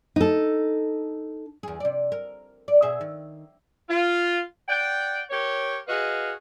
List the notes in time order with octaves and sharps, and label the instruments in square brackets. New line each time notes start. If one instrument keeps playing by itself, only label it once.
[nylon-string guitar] D#4 A4
[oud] E2 G#4
C3 D5
A#4
D5
B2 G#4 E5
D#3
[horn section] F4
D5 F#5 G5
G4 A#4 C#5
F#4 G#4 B4 D#5 F5